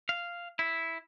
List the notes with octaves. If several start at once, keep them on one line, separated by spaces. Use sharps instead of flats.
F5
E4